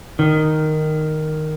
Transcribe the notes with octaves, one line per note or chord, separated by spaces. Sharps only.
D#3